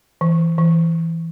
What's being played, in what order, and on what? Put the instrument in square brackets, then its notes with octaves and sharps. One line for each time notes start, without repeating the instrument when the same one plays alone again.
[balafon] E3
E3